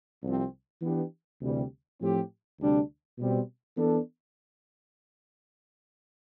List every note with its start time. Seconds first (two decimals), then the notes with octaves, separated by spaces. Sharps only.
0.23 C2 C3 F3 C4
0.82 E3 B3 D4 G4
1.41 D2 C3 E3 G3
2.00 A2 F3 C4 G4
2.59 D2 C3 G3 D4
3.19 B2 G3 C4
3.78 E3 B3 D4 A4